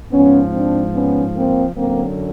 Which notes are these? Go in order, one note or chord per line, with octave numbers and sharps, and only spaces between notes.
G#2 F3 B3 C#4
C4 D4
B3 C#4
A#3 C4
F#2 D3 F#3 A#3 C4